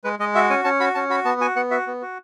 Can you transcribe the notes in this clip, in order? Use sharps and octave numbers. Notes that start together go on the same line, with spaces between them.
G#3 B4
G#3 D#5
F#4 E5
C#4 G#5
C#4 A5
F#4 B5
C#4 A5
F#4 B5
B3 A5
F#4 G#5
B3 F#5
F#4 E5
B3
F#4